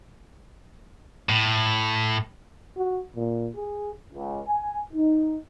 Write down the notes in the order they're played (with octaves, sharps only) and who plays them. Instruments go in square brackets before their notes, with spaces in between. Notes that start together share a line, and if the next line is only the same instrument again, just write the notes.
[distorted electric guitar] A2
[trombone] F#4
A#2
G#4
[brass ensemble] C#2
G#5
D#4